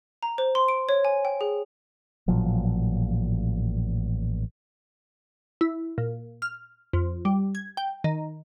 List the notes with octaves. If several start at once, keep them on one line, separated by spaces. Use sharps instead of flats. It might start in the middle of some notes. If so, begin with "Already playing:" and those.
A#5
C5
C6
D7
C#5
G#5
G5
G#4
A1 A#2 F3 F#3
E4
A#2
F6
F2
G3
G#6
G5
D#3